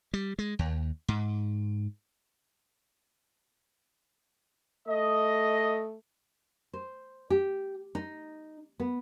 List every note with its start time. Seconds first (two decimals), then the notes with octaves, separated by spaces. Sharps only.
0.14 G3
0.39 G#3
0.59 D#2
1.08 G#2
4.88 A3 D#5
6.73 C5
7.30 G4
7.95 D#4
8.80 B3